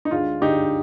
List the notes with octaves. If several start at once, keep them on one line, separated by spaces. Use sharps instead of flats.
D#4
D2 D3 G#3 F4
D2 D3 G#3 D#4 G4